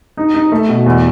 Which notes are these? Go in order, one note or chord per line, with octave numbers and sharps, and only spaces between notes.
D#4
D#4
A3
B2
E2